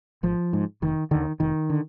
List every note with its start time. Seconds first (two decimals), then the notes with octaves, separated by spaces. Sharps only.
0.23 G#1 F3
0.53 G#2
0.82 F1 D#3
1.11 D#2 D3 D#3
1.40 F1 D#3
1.70 D3